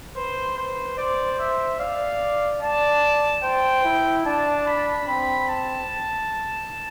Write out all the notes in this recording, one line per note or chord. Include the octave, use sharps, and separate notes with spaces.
B4 C5
C5
C5 D5
E5
D5 F5
D5 A5
C5 G5
E4
D4 A5
B5
C4 B5
A5